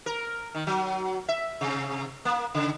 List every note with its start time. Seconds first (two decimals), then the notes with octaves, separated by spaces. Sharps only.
0.06 A#4
0.55 D#3
0.67 F#3
1.29 E5
1.61 C3
2.25 A#3
2.55 C#3